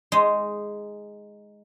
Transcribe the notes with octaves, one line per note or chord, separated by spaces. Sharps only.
G#3 D#4 D#5